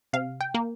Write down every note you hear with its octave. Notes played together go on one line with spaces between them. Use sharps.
C3 F5
G5
A#3